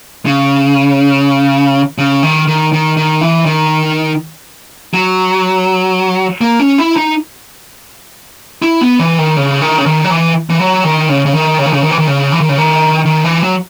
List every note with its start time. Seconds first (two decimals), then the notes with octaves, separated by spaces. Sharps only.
0.26 C#3
1.98 C#3
2.23 D#3
2.47 D#3
2.73 D#3
2.97 D#3
3.21 E3
3.46 D#3
4.94 F#3
6.41 A#3
6.59 C#4
6.78 E4
6.97 D#4
8.62 E4
8.81 B3
8.99 E3
9.18 D#3
9.37 C#3
9.61 D#3
9.78 C#3
9.86 D#3
10.04 F#3
10.10 E3
10.50 E3
10.60 F#3
10.84 D#3
11.09 C#3
11.26 C#3
11.33 D#3
11.58 C#3
11.66 D#3
11.73 C#3
11.83 D#3
11.91 E3
11.99 D#3
12.07 C#3
12.32 E3
12.41 D#3
12.49 C#3
12.58 D#3
13.06 D#3
13.24 E3
13.43 F#3